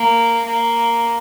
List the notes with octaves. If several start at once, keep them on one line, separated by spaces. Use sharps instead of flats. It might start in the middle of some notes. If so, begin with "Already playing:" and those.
Already playing: A#3
A#3